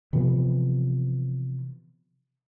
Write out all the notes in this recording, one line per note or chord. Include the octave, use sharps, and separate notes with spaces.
C3 E3 F3 B3